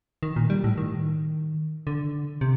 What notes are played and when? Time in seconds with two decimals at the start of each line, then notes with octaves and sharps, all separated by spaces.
0.23 D#3
0.36 A#2
0.50 G3
0.64 A2
0.78 D#3
1.87 D3
2.41 C3